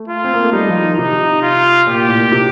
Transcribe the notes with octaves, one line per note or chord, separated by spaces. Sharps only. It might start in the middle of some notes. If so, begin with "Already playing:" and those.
Already playing: A3
F4
C4
A#3
A3
G3 D#4
F3
D#3
C3 D#4
F4
A#2 G4
A2
A#2
C3